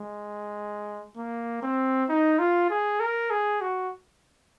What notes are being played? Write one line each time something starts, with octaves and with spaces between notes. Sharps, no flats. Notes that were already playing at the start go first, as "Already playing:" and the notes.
Already playing: G#3
A#3
C4
D#4
F4
G#4
A#4
G#4
F#4